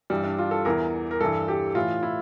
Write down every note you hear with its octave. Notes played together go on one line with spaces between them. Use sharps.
G2 E3 G3
D4
F4
A4
E2 E3 A#4
A#4
G2 E3 A4
G4
A2 E3 F4
E4